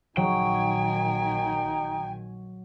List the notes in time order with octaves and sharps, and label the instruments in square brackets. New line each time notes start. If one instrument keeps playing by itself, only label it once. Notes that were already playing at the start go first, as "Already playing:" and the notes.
[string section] A#1 D#3 G#5 [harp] F#3 [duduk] D#4 [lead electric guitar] G5